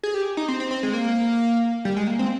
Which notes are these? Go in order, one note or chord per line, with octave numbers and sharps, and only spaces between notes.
G#4
G4
D#4
C4
C4
C4
G#3
A#3
G3
G#3
A#3
C4